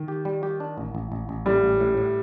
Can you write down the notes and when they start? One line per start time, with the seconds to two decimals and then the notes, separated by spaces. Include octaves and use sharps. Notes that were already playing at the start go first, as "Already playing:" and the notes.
Already playing: D#3
0.08 G4
0.25 G3
0.43 G4
0.60 D4
0.78 A1
0.95 A1
1.12 A1
1.29 A1
1.46 A2 G3
1.64 A1
1.80 A2
1.98 A2